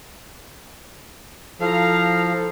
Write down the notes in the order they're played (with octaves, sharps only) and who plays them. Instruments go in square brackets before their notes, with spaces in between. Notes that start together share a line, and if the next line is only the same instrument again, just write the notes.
[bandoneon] F3 [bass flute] E4 [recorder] A4 [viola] F5 A#5